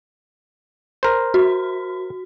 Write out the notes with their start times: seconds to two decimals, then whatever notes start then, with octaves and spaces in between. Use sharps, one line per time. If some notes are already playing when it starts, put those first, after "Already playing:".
1.03 A#4 C5
1.34 F#4